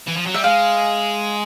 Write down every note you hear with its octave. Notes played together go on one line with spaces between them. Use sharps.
E3
F3
F#3
G3 E5
G#3 F5